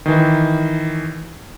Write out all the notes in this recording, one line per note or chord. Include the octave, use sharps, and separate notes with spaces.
D#3 E3